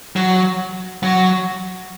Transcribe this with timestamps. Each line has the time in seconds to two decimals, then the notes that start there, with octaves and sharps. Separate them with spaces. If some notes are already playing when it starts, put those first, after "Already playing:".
0.16 F#3
1.03 F#3